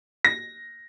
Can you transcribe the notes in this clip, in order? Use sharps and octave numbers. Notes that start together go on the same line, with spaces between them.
A#6